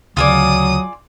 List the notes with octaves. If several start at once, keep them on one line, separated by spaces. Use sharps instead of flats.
D2 C#3 F#3 F4 G#4 D5 D#6